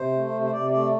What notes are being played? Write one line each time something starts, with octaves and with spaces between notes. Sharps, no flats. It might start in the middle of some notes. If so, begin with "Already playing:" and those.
Already playing: C3 C5
A3
C3
C5
C3 D5
A3 D5